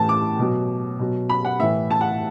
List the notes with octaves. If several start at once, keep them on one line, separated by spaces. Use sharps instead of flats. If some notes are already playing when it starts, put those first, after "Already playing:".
Already playing: A2 E3 A5
D6
B2 F#3
B2 F#3
B5
F#5
A2 E3 E5
A5
F#5